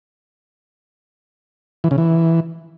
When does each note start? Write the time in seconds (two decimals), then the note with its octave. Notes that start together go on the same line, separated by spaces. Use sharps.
1.84 E3
1.91 C#3
1.98 E3